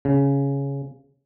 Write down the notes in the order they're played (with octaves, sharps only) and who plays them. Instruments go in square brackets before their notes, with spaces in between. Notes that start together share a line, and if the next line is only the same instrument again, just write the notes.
[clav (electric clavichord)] C#3